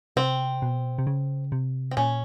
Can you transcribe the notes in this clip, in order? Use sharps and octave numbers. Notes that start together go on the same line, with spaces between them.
C3 C4
B2
C3
C#3
C3
C4
A#2 C#4